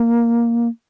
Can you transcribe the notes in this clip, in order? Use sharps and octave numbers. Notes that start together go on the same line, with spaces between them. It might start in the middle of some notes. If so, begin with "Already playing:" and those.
Already playing: A#3